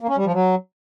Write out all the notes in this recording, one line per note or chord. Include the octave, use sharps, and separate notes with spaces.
A#3
C#4
G3
F3
F#3